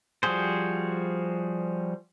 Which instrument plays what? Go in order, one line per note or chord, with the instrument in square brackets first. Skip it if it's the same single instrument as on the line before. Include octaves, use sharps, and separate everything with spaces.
[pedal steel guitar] F3 G3 F#4 G#4 C5